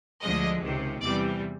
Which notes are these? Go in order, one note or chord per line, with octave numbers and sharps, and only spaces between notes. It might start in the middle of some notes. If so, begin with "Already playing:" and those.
D2 D3 F3 G#3 D#5
C#2 C3 D#3
E2 C3 E3 G3 D5